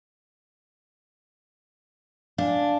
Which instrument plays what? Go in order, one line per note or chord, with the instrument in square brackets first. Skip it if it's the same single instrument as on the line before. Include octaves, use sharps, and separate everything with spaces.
[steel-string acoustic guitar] D4 [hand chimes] F5 G#5